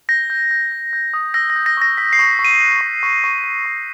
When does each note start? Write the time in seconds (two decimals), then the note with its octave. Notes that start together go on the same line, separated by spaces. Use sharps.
0.09 G6 A#6
0.30 G6
0.51 G6
0.72 G6
0.93 G6
1.14 D#6
1.34 E6 A#6
1.50 A#6
1.56 G6
1.66 A#6
1.77 C#6 A#6
1.97 E6 B6
2.13 C7
2.19 C#6
2.39 C#6
2.44 D#7
2.61 F#6
2.81 C#6
3.03 C#6
3.24 C#6
3.44 C#6
3.66 C#6